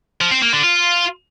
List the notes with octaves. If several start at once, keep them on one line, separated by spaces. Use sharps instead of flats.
F3
C4
A#3
D3
F4